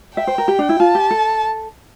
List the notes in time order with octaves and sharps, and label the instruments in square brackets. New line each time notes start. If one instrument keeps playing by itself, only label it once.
[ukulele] E5 [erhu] G5
[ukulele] C5
A#4
G4
D4
E4
[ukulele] F4 [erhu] A5
[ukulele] G4
A4